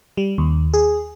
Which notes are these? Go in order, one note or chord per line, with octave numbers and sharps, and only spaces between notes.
G3
D#2
G#4